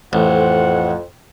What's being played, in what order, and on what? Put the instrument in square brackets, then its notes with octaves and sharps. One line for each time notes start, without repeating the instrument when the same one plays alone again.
[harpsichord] A1 [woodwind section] F2 [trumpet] F#5